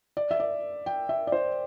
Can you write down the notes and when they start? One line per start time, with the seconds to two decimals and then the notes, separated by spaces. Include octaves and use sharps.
0.17 D5
0.31 E5
0.40 D5
0.86 G5
1.09 E5
1.27 D5
1.32 C5